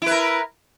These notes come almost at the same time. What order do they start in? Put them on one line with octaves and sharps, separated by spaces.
E4 B4 A#4